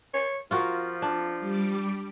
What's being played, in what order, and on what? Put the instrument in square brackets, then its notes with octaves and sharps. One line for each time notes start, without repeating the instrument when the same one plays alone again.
[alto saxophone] C#5
[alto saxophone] F3 [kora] F4 F#4 A#4
[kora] D4
[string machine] G3 D6